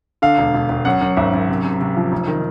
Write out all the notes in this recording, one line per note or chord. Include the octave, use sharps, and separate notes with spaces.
D3 F5
E1
E1
E1
F#2 F#5
F#2
G#1 E5
F#2
C3
C3
C3
F3
F1
D#3